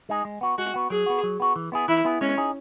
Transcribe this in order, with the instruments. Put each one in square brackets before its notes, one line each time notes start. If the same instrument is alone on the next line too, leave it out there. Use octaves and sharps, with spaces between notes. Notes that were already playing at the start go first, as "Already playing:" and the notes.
[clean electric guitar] G#3 D#4 G#4
G#3
B3 F#4
[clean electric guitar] G#3 [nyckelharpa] F#4
[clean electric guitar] B3 F#4
[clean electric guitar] F#3 [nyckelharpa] G#4
[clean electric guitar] B3 F#4
F#3
B3 F#4
E3
B3 E4 G#4
[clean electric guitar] E3 [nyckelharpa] E4
[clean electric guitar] B3 E4 G#4
[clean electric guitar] G#3 [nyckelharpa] C#4
[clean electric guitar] D#4 G#4